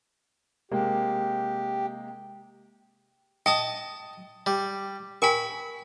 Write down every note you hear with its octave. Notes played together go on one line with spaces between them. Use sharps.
C3 G#3 A#3 G4
D#5 G5 A5 D#6
G3
A#4 G5 G#5 B5 C#6